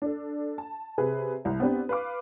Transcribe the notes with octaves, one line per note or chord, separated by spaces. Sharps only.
D4 A4
A5
C3 G#4 B4
C2
B3 C4 D4 G4 B4
B4 F5 D6